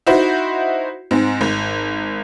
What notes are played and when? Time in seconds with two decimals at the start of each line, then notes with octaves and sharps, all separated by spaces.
0.07 D#4 E4 F#4 C5
1.11 G#2 C4
1.41 G#1